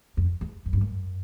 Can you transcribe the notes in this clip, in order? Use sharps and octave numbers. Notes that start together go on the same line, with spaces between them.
F2
E2
F#2
G2
F#2